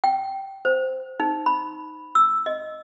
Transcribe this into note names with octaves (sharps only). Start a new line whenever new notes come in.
G5
C5
D#4
B5
E6
D#5